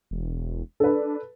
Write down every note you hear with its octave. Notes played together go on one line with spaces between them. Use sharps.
E1
D4 A4 B4